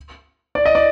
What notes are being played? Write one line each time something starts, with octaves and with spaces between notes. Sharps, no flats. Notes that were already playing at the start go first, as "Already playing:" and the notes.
D5
D#5
D5